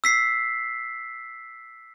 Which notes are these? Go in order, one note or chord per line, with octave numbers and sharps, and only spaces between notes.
E6 B6 C7